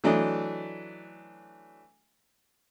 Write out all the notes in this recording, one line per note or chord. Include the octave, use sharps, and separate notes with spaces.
E3 F#3 A3 D4 D#5